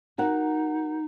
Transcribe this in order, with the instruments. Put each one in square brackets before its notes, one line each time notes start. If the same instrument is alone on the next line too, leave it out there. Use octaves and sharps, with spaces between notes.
[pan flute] D#4 [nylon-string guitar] F#4 A#4 F#5